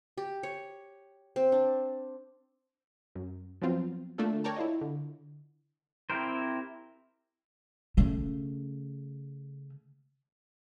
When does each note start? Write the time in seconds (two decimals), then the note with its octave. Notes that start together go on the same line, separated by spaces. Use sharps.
0.18 G4
0.43 C#5
1.36 C4
1.52 D4
3.15 F#2
3.62 F3 F#3 B3 C4 F4
4.18 D3 A3 A#3 D4 F4 A4
4.44 A#4 C#5 D5 G5 A5 A#5
4.56 E4 F4 D#5
4.81 D3
6.10 C4 E4 G4 A#4 C5
7.97 C#3 A3